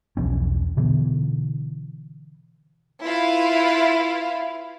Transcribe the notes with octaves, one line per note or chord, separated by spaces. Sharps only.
B1 E2 F3 C#4
B2 D3 E3 B3
E4 F4 B4 F5